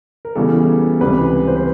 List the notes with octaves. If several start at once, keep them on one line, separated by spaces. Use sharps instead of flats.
A#4
E2 C#3 E3 G3 A4
C#2 C3 E3 G3 B4
C5
B4